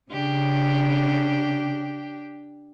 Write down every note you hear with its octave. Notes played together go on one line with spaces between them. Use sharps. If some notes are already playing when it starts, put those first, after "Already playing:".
C#3 D4 G4